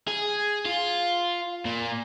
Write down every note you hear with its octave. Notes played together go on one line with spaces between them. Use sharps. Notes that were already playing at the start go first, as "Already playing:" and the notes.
G#4
F4
A#2